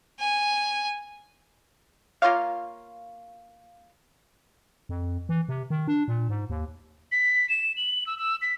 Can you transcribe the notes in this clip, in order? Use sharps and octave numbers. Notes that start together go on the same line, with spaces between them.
G#5
A#3 F4 C#5 F5
F2
E3
C3
D#3
D4
A#2
G#2
D#2
B6
E7
F#7
E6
E6
B6